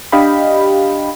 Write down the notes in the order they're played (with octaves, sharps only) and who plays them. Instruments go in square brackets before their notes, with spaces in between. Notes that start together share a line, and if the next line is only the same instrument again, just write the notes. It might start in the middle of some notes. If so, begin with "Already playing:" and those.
[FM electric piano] D4 G4 D#5 F5 G5 B5